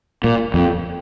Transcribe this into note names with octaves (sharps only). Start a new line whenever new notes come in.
A#2
F2